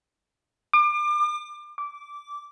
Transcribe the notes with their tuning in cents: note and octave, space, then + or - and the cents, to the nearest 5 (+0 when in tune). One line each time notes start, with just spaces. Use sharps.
D6 +35
D6 -15